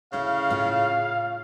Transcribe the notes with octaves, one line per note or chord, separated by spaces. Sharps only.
D2 C#3 E4 F5
A2 F4